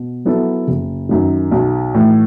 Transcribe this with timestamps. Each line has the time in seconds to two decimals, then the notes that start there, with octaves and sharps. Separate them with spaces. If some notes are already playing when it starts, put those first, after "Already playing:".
Already playing: B2
0.25 F#3 B3 E4 A4
0.68 F#1
1.09 F#2 D#3
1.52 B1
1.94 A2 E3